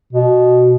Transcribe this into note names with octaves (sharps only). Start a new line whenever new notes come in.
B2